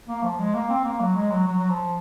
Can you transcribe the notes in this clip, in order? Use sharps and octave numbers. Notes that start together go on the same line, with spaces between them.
A#3
F3
G#3
A#3
C4
A#3
F#3
G#3
F#3
F#3
F#3
F3